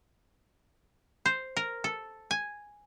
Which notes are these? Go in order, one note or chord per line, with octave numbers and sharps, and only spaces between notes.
C5
A#4
A4
G#5